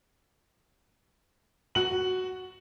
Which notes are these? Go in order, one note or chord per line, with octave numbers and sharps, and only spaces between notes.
F#4 F#7